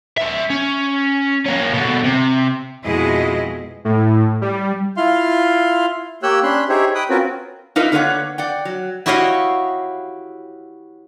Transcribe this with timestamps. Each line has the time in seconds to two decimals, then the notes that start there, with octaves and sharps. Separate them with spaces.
0.18 C#4 E5
0.50 C#4
1.46 A#3 C#4
1.74 B2 D3
2.04 C3
2.84 F2 B2 G#3 E4 G#4 D#5
3.85 A2
4.41 G3
4.97 E4 F4 F5 C6
6.23 A#3 G4 C#5 E6 F#6 G6
6.43 C#4 D4 B5 C6 F#6
6.69 D#4 G4 G#4 C5 C#5 E5
6.95 G5 B5 D#6 F#6
7.09 C4 C#4 F4 F#4 A#4 B4
7.76 D#4 F4 A#4 B4 D#5 E5
7.92 D3 A#3 B4 C#5 F#5
8.38 D5 F#5 G5
8.65 F#3
9.06 E4 F#4 G4 C#5 D#5 F5